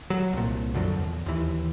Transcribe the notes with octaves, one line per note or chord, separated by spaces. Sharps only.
F#3
C2 A#2
F#2 D3 F3 F#3
E2
D#2 E3